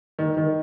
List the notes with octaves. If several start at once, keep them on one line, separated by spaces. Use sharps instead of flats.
D#3
D#3